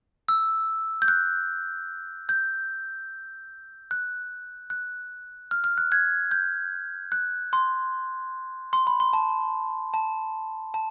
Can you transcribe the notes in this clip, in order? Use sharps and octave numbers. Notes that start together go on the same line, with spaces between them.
E6
G6
F#6
G6
F#6
F#6
F6
F6
F#6
F#6 G#6
G6
F#6
C6
C6
B5
C6
A5
A5
A5